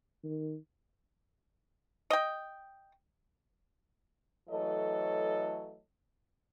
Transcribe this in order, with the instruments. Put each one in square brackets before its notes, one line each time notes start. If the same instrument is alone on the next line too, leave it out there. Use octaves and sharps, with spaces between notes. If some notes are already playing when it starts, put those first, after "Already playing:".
[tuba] D#3
[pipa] D#5 G5
[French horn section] E3 F#3 A3 A4 C#5 D#5